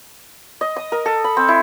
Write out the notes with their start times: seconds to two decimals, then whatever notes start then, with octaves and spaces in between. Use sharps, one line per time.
0.61 D#5
0.76 D#6
0.92 A#4
1.06 A4
1.24 B5
1.37 C4
1.48 E4